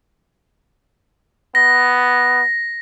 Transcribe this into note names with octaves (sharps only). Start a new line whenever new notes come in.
B3 A#6